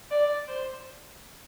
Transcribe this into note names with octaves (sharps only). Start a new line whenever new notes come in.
D5
C5